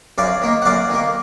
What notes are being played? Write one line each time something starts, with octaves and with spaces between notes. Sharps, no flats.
F#2 D5 F5
D#3 A#3
F#5
F#2 D5 F5
D#3 A#3